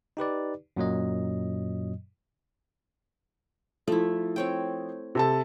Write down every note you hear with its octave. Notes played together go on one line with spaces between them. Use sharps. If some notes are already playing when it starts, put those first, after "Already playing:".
D#4 G4 B4 D5
F#2 A#2 F#3 D#5
F3 A3 E4
C4 C#5 G5
C3 A4 A5